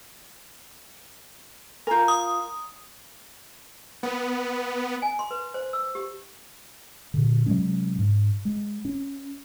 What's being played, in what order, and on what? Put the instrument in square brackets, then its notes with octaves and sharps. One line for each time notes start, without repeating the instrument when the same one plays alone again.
[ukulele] F4 A#4 [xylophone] G#5 A#5 G6
[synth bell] D#6
[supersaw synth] B3
[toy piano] G#5
C6
B4
C5
E6
G4
[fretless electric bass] A#2 D3
C3 F#3 G#3 C#4
G#2
G#3
C#4